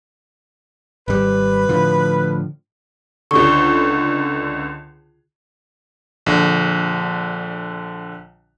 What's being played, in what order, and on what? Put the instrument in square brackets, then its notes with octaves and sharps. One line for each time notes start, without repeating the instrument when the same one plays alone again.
[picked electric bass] G#1 G3 [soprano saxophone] B4
[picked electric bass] A2 D3 F3
[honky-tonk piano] C#2 D3 [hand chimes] D4 C#6
[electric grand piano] A#1 D3